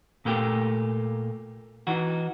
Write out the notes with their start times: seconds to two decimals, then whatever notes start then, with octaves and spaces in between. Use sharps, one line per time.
0.25 A#2 A3 A#3 G4
1.87 E3 D#4 F#4